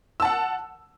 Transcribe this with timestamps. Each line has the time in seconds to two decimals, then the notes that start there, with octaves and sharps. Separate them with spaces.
0.20 E6
0.22 A5
0.25 F#5